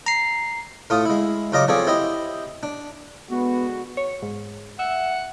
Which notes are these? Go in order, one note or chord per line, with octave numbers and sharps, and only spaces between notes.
A#5 C7
A2 A3 F4 D#6
G#3 E4
F#2 C#3 F4 D#5 A#5 D6
F3 C4 G#4 A4 C#5 D5
E4 G4 C5 D#5
D4
D3 G#3 B3 F#4
C#5
G#2
E5 F#5